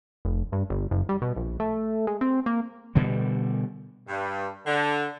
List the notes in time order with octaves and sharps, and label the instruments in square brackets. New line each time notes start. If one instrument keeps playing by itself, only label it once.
[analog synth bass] F1
G2
G1
F#1
G3
B2
A#1
A3
G#3
C4
A#3
[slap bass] B2 D3 G3
[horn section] G2
D3